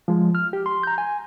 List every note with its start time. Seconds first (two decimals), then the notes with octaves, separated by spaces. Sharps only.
0.08 F3 G#3
0.35 F6
0.53 G4
0.66 C6
0.83 A#5 G6
0.98 G#5